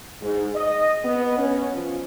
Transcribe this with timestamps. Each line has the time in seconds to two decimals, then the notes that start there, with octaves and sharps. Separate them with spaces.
0.22 G#2
0.54 D#5
1.04 B3
1.38 C#4
1.72 F3